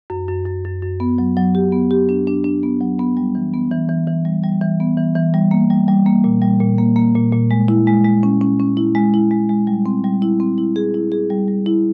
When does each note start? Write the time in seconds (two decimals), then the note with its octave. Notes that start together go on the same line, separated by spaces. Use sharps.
0.10 F#2
0.28 F#2
0.46 F#2
0.64 F#2
0.82 F#2
1.00 B3
1.18 F#3
1.37 F#3
1.55 G4
1.72 B3
1.91 G4
2.09 D4
2.27 D4
2.44 D4
2.63 B3
2.81 F#3
2.99 B3
3.17 G3
3.35 E3
3.54 B3
3.71 E3
3.89 E3
4.07 E3
4.25 G3
4.44 G3
4.62 E3
4.80 B3
4.97 E3
5.16 E3
5.34 G3
5.51 A#3
5.70 G3
5.88 G3
6.06 A#3
6.24 A#2
6.42 G3
6.60 A#2
6.78 A#3
6.96 A#3
7.15 A#2
7.33 A#2
7.51 G#3
7.68 E4
7.87 G#3
8.05 G#3
8.23 C#4
8.41 C#4
8.60 C#4
8.77 E4
8.95 G#3
9.14 E4
9.31 G#3
9.49 G#3
9.67 G3
9.86 C4
10.04 G3
10.22 E4
10.40 C4
10.58 E4
10.76 G#4
10.94 E4
11.12 G#4
11.30 G3
11.48 G3
11.66 E4